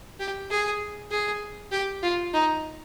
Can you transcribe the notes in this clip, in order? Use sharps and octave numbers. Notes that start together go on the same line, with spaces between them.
G4
G#4
G#4
G4
F4
D#4